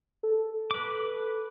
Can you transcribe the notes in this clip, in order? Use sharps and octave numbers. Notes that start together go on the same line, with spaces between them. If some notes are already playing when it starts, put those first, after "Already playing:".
A4
B4 D6